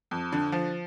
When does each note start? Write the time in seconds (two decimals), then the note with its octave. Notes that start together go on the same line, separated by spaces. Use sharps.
0.11 F2
0.32 D3
0.52 F3